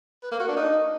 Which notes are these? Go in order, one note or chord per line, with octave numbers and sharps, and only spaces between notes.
B4
A#3
F#4
D4
D#4